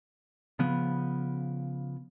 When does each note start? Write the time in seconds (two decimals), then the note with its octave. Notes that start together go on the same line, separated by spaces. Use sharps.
0.59 C#3 F3 B3